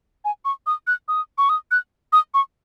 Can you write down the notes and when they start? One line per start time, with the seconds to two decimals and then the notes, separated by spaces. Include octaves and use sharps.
0.25 G#5
0.45 C#6
0.67 D#6
0.87 F#6
1.08 D#6
1.38 C#6
1.49 D#6
1.71 F#6
2.13 D#6
2.34 C#6